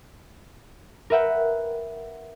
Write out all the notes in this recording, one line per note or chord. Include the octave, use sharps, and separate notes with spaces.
A#4 B4 E5 F#5 G5